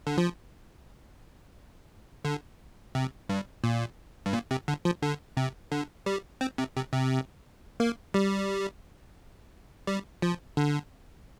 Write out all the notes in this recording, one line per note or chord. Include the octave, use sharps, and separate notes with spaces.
D3
F3
D3
C3
G2
A#2
G2
A#2
C3
D3
F3
D3
C3
D3
G3
C4
C3
C3
C3
A#3
G3
G3
F3
D3